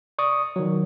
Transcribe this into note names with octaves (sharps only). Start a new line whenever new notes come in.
D5 C#6 D#6
D#3 F#3